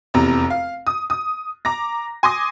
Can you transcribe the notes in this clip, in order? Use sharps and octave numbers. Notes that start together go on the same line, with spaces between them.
F1 E2 C3 A#5
F5
D#6
D#6
A#5 D6 A#6
G#5 C6 D6 D#6 A#6